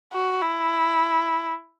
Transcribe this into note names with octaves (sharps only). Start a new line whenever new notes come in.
F#4
E4